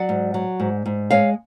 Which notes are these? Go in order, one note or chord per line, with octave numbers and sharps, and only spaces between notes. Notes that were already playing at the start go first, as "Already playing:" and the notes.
Already playing: F#3 D5 F#5
G#2
F#3
G#2
G#2
G#3 C#5 F5